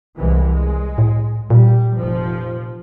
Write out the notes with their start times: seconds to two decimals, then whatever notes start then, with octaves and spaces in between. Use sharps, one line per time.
0.19 C2 E3 G#3
0.53 G#3
0.98 A2
1.50 A#2 G3
1.95 F1 F3